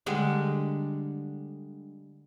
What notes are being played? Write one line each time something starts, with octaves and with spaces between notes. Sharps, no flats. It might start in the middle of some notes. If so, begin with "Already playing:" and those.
D3 G3 G#3 D4